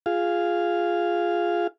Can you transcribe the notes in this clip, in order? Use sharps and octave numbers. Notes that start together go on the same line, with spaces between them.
F4 G#4 F5